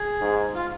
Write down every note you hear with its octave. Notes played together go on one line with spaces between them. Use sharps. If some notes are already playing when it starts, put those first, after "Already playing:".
Already playing: G#4
G#2
F4